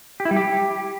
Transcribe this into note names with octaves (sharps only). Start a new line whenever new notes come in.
G4
E4
G3
G4